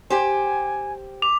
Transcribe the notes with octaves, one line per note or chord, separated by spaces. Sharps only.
G4 C5 G#5
D6 F7